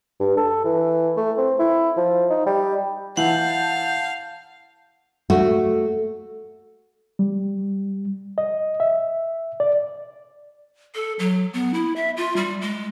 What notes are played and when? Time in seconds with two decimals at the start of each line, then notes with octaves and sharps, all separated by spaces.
0.20 G2
0.37 A4
0.65 E3
1.17 A3
1.37 C4
1.59 E4
1.97 F3
2.30 D#4
2.46 G3
3.17 E3 F5 F#5 A5 G6
5.30 A3 F#4
7.19 G3
8.38 D#5
8.80 E5
9.60 D5
10.95 A4
11.19 F#3
11.54 B3
11.74 E4
11.96 E5
12.17 F4
12.36 G3
12.62 G#3